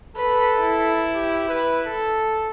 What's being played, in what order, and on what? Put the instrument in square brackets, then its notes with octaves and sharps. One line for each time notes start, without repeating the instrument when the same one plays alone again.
[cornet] A4 [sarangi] B4
[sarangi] E4
[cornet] G4
B4
A4